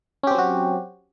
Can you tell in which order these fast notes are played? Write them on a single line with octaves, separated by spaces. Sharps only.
C#4 G4 C4 F#3 F#4